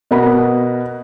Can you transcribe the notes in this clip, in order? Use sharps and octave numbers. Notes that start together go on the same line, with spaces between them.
B2 A#4 F#5 B5